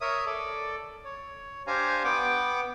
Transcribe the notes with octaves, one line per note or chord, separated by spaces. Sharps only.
A#4 C#5 E5 D#6
A4 D5
C#5
D4 G4 C5 F5 G#5 A#5
B3 F#5 G5 D6